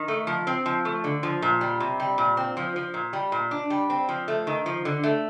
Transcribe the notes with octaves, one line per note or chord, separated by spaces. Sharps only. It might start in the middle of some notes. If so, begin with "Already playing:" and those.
Already playing: D#3
A3
F3
C4
F3
A3
D3
F3
A#2
G3
C3
G3
A#2
C4
F3
F3
A#2
G3
A#2
D4
G3
C4
F3
A3
D#3
F3
D3
A3